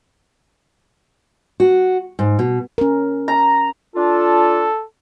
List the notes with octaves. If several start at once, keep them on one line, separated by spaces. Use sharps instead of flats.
F#4
G#2
B2
C#4 A#4
A#5
D4 F4 A4